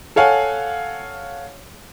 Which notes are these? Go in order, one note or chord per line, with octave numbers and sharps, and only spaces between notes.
A4 C#5 F5 F#5 G#5